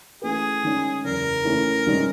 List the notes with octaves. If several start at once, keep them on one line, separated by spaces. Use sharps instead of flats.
E3 A3 C#4 F#4 G#4 B4
D#3 G#3 C#4
F#1 E2 C#3 A#4
E3 A3 C#4 E4
C2 B2 G#3 C#4